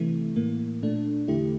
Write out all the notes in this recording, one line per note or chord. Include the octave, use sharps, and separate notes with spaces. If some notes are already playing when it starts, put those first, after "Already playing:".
Already playing: C3 E3 A3
A2 E3 A#3
A#2 A3 D4
E2 D3 A3 E4 G4